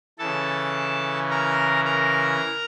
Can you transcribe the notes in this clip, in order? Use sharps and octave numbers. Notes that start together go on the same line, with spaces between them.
C#3 E3 A4 A5
A#4 A#5
A#4 A#5